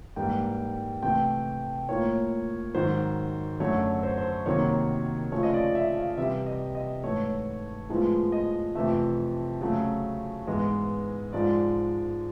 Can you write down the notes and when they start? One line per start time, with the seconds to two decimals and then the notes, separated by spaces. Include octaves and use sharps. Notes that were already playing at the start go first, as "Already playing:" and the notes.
0.16 G#2 E3 G3 A#3 G5
1.02 C3 E3 A3 G5
1.88 A2 F3 A#3 C#5
2.74 G#2 D#3 F#3 C5
3.60 F#2 D3 F#3 A3 C#5
4.03 C5
4.18 C5
4.46 C3 D#3 F#3 A#3 C#5
5.32 C#3 F3 A3 C#5
5.43 D#5
5.54 D5
5.75 E5
5.97 F5
6.17 C3 E3 G3 E5
6.46 D#5
6.75 D#5
7.03 G#2 E3 A3 C#5
7.89 A2 F3 G#3 B3
8.32 D#5
8.75 F2 C3 E3 A3 E5
9.61 C#3 F#3 A3
10.47 G#2 E3 G#3 B3
11.33 G#2 F3 G#3 D5